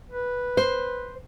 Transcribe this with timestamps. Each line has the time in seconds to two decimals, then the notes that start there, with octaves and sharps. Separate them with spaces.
0.10 B4
0.57 C5